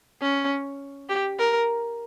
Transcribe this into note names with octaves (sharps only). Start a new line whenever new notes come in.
C#4
G4
A#4